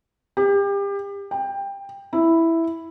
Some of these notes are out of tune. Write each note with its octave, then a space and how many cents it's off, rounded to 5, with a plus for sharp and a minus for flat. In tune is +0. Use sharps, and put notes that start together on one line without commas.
G4 +30
G5 +15
E4 +0